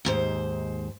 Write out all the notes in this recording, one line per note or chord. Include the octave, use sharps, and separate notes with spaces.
D#2 G#2 C5